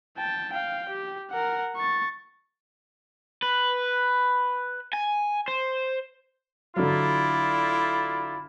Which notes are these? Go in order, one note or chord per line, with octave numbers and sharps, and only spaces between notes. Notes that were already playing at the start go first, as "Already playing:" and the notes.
G5 A5
F5 G5
G4
A#4 F#5
C#6 A6
B4
G#5
C5
D3 F#3 E4 F4 D5